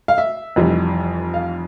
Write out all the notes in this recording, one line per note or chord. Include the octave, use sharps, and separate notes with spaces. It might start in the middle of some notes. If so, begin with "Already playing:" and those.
F5
E5
F1 F2 E3 G3
F5